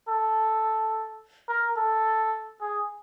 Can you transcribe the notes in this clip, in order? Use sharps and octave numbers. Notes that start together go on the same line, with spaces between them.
A4
A#4
A4
G#4